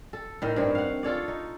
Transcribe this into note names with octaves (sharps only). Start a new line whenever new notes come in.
A4
A2 D#3
G2 C4 C#5
F5 F#5
F4 A4 C#5 D5
D#4